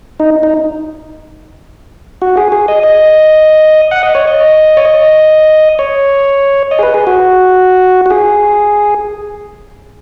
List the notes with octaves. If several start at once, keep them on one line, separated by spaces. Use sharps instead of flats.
D#4
D#4
F#4
G#4
G#4
D#5
D#5
F#5
D#5
C#5
D#5
C#5
D#5
C#5
D#5
G#4
B4
G#4
F#4
F#4
G#4